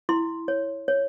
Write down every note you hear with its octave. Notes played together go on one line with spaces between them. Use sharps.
E4 C6
C#5
C#5